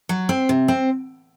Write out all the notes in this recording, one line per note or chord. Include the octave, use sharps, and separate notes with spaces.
F#3
C4
C3
C4